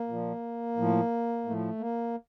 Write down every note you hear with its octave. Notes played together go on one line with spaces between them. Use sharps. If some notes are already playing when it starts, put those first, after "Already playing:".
Already playing: A#3
A#2 F3
A2 F3
A2 F3 A3
A#3